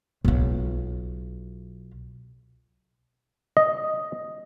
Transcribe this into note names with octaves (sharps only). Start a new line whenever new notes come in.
B1 F4
D#5